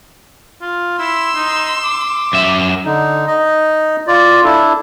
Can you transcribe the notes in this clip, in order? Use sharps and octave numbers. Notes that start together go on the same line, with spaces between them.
F4
E4 C6 E6
D#4
D6
F#2 E5
D3 D#4
D#4 D#5
F4 D5
D4 E4 A4